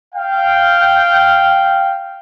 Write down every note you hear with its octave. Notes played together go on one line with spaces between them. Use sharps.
F5 G5